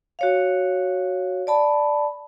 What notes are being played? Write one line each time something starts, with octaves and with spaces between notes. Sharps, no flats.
F#4 C#5 F5
D5 A5 B5